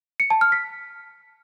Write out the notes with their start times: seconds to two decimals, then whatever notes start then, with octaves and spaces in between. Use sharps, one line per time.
0.20 C#7
0.30 A5
0.41 F6
0.52 B6